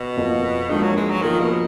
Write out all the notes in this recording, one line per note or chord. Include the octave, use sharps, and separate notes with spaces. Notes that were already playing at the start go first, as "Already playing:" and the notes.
Already playing: B2
F2 F3 A#3
G#2 D#3 F3 A#3 D4 F#4
F#3
G#3
F#3
D#3 F3 A#3 F4 A#4
B2